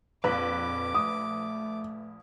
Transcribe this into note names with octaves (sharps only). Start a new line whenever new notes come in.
A#1 F2 B4 D6
A3 D#6